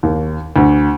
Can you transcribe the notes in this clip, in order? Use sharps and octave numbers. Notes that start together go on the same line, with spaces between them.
D#2
D2